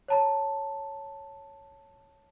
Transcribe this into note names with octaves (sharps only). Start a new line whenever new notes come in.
C#5 A5 A#5